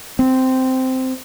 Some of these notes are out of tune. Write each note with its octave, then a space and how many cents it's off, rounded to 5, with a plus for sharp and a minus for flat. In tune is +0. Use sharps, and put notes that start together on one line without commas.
C4 -10